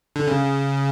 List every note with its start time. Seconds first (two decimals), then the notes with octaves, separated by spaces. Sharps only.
0.16 D3
0.27 C#3